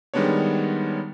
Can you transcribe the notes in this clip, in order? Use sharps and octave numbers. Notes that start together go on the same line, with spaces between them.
D#3 G3 G#3 B3 D4 C#5